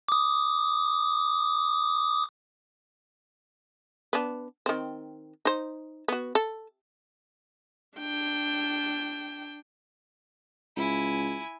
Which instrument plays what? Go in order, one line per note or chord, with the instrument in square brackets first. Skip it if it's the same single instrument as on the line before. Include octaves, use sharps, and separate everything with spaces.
[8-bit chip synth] D6 D#6
[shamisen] B3 D4
D#3 C4
D#4 C5
B3 F#4
A4
[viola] D4 G5
[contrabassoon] C#2 [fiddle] E4 G#5